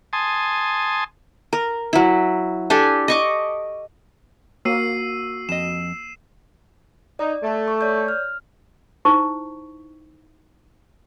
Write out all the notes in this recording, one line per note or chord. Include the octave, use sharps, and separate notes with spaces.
G#5 A5 C6 D#6
A#4
F#3 E4
D4 G4 A4 G#5
D#5 C#6 D6
A#3 F#4 E6 C7 D#7
F2 D#5 E7
D#4 D5
A3
C#6
C#5 D5 G6
F6
D#4 E4 C5 C#6